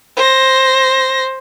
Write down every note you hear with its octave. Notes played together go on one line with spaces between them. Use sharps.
C5 A#6